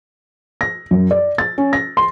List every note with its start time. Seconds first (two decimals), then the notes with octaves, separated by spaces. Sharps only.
0.61 A#6
0.91 F#2
1.11 D5
1.38 A6
1.58 C#4
1.73 A#6
1.97 C6